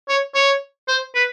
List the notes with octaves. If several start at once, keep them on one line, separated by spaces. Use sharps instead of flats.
C#5
C#5
C5
B4